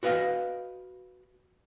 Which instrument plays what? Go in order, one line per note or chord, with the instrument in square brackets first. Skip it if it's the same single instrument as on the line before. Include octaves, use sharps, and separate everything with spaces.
[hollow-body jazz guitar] F#4 B4 D#5 F5